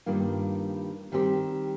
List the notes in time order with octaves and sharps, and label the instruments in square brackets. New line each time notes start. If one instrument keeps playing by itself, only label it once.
[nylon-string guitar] G2 D#3 G3 A#3 F4
D#3 G3 C4 G4